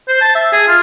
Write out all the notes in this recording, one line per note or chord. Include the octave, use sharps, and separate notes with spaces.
C5
A5
E5
G#4
F4